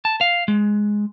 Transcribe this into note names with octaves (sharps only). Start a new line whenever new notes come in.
A5
F5
G#3